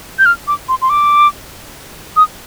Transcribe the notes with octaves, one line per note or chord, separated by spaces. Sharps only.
G6
F6
D6
C6
C6
D6
D#6